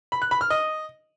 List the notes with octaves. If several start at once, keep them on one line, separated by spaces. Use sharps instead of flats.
B5
F#6
B5
F6
D#5